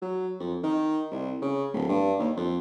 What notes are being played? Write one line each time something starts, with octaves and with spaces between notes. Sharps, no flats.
F#3
F2
D#3
C2
C#3
D1
G2
D#2
F2